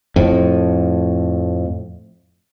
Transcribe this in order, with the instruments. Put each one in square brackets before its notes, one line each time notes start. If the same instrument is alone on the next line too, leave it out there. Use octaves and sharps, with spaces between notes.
[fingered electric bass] F2 A2